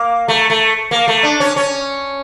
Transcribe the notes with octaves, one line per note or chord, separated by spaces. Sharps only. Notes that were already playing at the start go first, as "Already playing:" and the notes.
Already playing: A#3
A3
A3
A#3
A3
D4
C#4
C#4